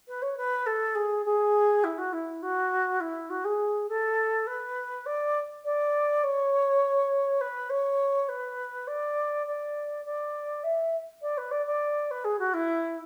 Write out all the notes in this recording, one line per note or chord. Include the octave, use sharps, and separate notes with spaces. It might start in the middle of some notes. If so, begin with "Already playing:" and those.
B4
C#5
B4
A4
G#4
G#4
E4
F#4
E4
F#4
E4
F#4
G#4
A4
B4
D5
D5
C#5
B4
C#5
B4
D5
D5
D5
E5
D5
B4
D5
D5
B4
G#4
F#4
E4